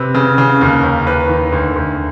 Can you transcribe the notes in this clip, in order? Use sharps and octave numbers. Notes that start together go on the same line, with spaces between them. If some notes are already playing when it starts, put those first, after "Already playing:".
Already playing: C3 B4
C#3
C#3
D#2
D#2
D#2 B4
D#3
D2
D2